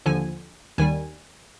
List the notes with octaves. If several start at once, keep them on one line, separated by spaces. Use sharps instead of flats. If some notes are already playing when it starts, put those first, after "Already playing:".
D#2 D3 F3 G#5
D#2 D#3 G3 G#5